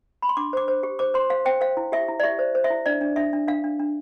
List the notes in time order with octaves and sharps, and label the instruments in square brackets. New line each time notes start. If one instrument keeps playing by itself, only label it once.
[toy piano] B5
C6
D4 D6
C5 D6
C5
G4
C5 D6
C5 C6
C5 F5
C5 G5
C5 F5
E4
G4 E5
E4
D5
G4 E5
C5
C5
E5
E4
D4 D5
D4
D4 E5
D4
D4 F5
D4
D4